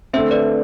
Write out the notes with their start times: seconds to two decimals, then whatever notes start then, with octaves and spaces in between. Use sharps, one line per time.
0.13 D3 A3 C4 C5 E5
0.31 B4 D5